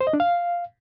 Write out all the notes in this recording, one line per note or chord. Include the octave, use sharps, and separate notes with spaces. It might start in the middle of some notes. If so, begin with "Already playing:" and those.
C5
D#5
D4
F5